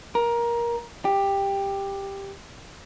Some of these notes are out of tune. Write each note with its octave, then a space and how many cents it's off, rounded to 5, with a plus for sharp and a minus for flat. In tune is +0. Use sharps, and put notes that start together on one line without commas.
A#4 +15
G4 +10